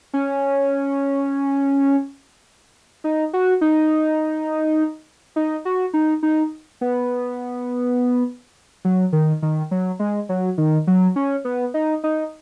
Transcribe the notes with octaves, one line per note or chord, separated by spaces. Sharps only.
C#4
D#4
F#4
D#4
D#4
F#4
D#4
D#4
B3
F#3
D#3
D#3
F#3
G#3
F#3
D#3
F#3
C#4
B3
D#4
D#4